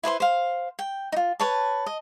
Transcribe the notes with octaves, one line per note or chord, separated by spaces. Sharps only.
E4 B4 C5 C6
C5 F5
G5
D#4 F4
B4 C#5 A5
D#5